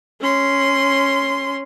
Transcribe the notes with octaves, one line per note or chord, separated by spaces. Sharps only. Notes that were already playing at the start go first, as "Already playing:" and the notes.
C#4 C6